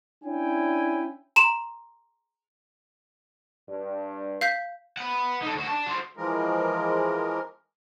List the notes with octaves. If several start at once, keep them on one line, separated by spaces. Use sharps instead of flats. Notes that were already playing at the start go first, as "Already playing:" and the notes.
C#4 D4 E4 G5 G#5
A#5 C6 E7
G2
F5 G6 B6
B4 F#5
D#4 A4
D2 F#4
D4 A5
F#4 C5
E3 F3 G#3 A#4